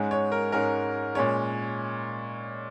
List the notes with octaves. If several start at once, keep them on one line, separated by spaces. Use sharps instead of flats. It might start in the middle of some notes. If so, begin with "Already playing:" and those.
Already playing: G#2 G#3 C#4
C#5
A#4
G#2 G#3 C#4 A#4
A#2 G#3 C#4 C#5